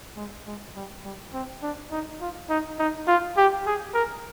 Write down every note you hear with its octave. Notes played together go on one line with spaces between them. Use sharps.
G#3
G#3
G3
G3
C4
D4
D#4
F4
D#4
D#4
F4
G4
G#4
A#4